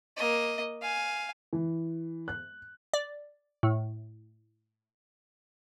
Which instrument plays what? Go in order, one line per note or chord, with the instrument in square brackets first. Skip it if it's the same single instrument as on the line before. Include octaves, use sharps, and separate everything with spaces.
[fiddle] A#3 D#5
F5 G#5
[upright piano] E3
F#6
[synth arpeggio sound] D5
A2